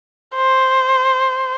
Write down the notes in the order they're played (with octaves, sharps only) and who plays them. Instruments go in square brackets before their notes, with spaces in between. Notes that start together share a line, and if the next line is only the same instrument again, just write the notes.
[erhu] C5